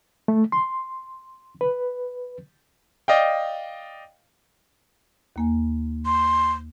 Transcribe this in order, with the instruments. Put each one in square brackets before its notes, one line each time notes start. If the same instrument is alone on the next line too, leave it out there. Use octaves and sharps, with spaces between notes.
[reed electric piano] A3
C6
B4
[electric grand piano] D5 D#5 F5 G5
[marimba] D#2 A#3 G#5
[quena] C6